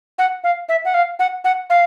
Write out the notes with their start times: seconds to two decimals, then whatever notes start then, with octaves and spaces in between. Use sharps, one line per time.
0.19 F#5
0.44 F5
0.69 E5
0.85 F#5
0.94 F5
1.19 F#5
1.44 F#5
1.70 F5